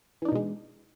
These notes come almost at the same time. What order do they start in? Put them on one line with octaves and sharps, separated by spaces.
E3 D4 D#4 B2 G#3